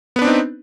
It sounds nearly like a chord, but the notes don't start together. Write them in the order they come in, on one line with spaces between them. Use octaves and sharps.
B3 B4 D4 C4 D#4